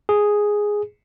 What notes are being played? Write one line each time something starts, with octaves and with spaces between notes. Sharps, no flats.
G#4